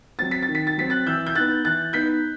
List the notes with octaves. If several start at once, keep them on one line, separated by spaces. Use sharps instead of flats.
F#3 C4 A6
B6
A6
D#3
B6
A6
F#3 C4 B6
F#6 A6
E3 E6 G6
G6
B3 D#4 F#6 A6
E3 F#6 A6
B3 D#4 G6 B6